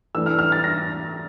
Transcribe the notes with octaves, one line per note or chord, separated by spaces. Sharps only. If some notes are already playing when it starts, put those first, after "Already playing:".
E3 A3 D4 E6
F6
F6
A6
A#6